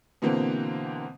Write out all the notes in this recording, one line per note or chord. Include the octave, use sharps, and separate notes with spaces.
B2 D3 E3 A#3 C4